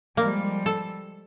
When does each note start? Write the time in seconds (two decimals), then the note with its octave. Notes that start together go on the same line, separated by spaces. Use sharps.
0.17 F3 G3 G#3 A#3
0.66 A4